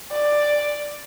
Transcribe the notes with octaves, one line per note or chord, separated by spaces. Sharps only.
D5